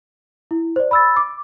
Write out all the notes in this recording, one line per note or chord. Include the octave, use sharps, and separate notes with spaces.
E4
C5 D5
B5 E6 A6
D6